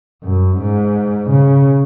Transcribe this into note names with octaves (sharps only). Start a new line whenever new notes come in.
F#2
G#2
C#3